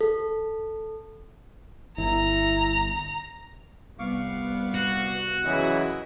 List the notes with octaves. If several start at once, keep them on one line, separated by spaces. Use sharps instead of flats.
A4
G1 E4 A#5
C2 B3 F5 C#6 D6
F#4
F#2 C#3 E3 D#5 E5 F#5